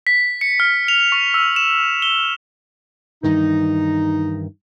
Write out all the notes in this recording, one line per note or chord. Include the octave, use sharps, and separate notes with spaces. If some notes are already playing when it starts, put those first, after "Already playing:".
B6
C#7
F6
F7
C#6
E6
E7
G7
G2 D#3 E3 D#4